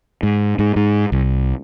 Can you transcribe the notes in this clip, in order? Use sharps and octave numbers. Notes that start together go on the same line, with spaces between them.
G#2
G#2
G#2
C2